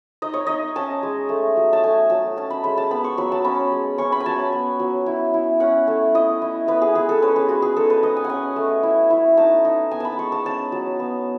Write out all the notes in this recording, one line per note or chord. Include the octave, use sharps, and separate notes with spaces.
D#4 D#5
C#5
D#4 D#5
C#4 A5
G#3
A3
F#3
A5
A3 G#5
F#3 A5
C#4 A5
B5
G#3 B5
A5
B3 B5
C#6
F#3 B5
A5
C#4 B5
G#3
C#4 C#6
B5
G#5
F#3 A5
G#5
B3
F#3
E4
E4
C#4 F#5
A3
E4 D#5
E4
B3 B4
G#4
G#3 G#4
A4
C#4 B4
G#4
G#3 F#4
G#4
D#4 A4
B4
D#4 D#5
G#5
F#5
C#4 G#5
A3
E4
E4
D#4 A5
D#4
B3 G#5
A5 B5
G#3 C#6
A5
C#4 A5
F#3
B3